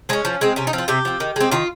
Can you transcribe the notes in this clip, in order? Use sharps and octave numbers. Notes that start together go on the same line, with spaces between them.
G#3 C4 C#4
F3
G#3 C4
C3 C#4
D#4
F3 C4
F4
C3 G4
F3 C4
D#3
G#3 C4
D#3 F4